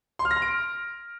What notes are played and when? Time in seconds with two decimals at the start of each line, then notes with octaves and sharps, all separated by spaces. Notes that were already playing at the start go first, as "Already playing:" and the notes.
0.19 C6
0.25 F6
0.31 A#6
0.36 C6
0.42 D7